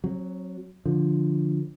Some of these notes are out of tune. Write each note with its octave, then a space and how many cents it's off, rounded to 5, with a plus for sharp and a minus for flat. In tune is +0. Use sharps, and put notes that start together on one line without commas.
F#3 +0 C4 +40
D3 +0 F3 +0